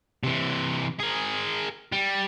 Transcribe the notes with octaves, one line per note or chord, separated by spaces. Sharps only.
C3 E3
G#4 A#4
G3